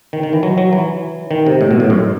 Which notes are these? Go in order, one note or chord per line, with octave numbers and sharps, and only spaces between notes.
D#3
D#3
E3
F#3
F#3
E3
D#3
C3
A2
B2
A2
F#2